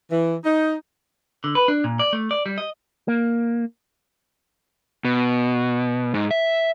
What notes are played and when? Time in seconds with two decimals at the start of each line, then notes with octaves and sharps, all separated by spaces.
0.12 E3
0.44 D#4
1.44 D3
1.55 B4
1.68 D4
1.84 A#2
1.99 D5
2.13 A3
2.31 D5
2.46 G3
2.58 D#5
3.08 A#3
5.05 B2
6.14 G#2
6.31 E5